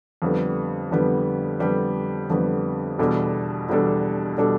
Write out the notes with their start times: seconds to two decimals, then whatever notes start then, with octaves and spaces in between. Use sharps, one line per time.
0.22 F2 D3 G3 B3
0.91 F2 D3 G3 B3
1.60 F2 D3 G3 B3
2.30 F2 D3 G3 B3
2.99 E2 B2 G3 D4 A4
3.69 E2 B2 G3 D4 A4
4.38 B2 G3 D4 A4